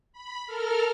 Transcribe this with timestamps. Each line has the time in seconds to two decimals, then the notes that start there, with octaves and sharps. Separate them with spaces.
0.13 B5
0.46 A4 A#4 F6